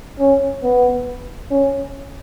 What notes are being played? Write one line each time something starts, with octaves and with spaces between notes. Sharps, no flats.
C#4
B3
C#4